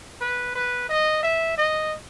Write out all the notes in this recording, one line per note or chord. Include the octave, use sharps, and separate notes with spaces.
B4
B4
D#5
E5
D#5